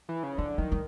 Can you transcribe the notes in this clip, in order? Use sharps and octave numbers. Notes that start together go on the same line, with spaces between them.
E3
C#3
D3 F3
D#3 F#3
G3